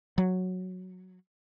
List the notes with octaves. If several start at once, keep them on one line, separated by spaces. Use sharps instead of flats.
F#3